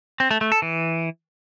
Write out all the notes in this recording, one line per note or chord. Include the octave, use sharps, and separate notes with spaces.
C4
A3
A3
A4
E3